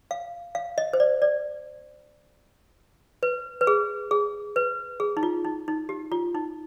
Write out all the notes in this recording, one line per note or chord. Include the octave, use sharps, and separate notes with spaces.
F5
F5
D#5
C5
D5
D5
B4
B4
G#4
G#4
B4
G#4
D#4
F4
D#4
D#4
G4
F4
D#4